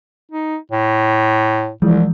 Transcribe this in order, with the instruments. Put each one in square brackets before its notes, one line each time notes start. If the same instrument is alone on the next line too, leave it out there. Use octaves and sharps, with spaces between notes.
[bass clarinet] D#4
A2
[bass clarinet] C2 [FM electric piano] E3 F3 G#3